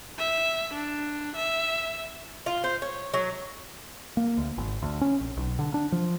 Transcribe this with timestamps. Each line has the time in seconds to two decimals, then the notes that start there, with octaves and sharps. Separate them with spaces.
0.18 E5
0.74 D4
1.36 E5
2.46 F4
2.64 C5
2.82 C#5
3.14 F#3
4.17 A#3
4.38 D2
4.58 G#1
4.82 D2
5.01 C#4
5.20 A#1
5.37 B1
5.59 D3
5.74 D4
5.92 F3